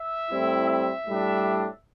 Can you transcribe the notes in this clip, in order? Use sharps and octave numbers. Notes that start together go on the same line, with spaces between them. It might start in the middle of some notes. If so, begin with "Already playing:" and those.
Already playing: E5
A2 G3 C4 E4
E5
A2 G3 D4